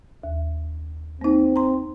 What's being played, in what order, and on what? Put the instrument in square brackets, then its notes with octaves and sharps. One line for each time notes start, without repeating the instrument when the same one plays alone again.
[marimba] D#2
[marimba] A#3 D#4 [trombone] C4
[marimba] A#5 C6